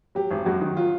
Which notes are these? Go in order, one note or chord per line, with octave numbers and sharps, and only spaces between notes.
F#3 G4
G#1
F#2 F#4
D#3
F#3 F4